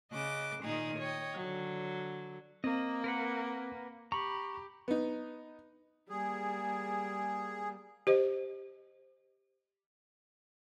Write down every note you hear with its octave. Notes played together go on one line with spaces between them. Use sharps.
C#3 D#5 D6 F#6
A#2 D#3 D#4 G#4 D#6
C#5 D#5 G5
D3 F#3
A#3 C4 D#5
A#4 B4 F#5
G4 A#5 B5 C#6
B3 D#4
G3 A#3 G#4
G4 C5 D#5